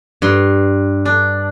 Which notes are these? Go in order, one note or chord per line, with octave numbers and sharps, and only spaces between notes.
G2 C6
D4